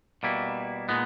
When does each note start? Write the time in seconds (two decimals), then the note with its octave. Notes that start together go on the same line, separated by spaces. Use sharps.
0.23 B2 G3 A#3 E4
0.89 A#2 G#3 B3 D#4